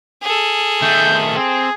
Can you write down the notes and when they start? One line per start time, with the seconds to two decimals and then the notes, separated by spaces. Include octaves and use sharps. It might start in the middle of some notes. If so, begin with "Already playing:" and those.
0.22 G#4 A4
0.82 D#3 A3 G6
1.36 C4 G#4